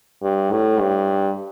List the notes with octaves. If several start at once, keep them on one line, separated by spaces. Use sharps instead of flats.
G2
A2
G2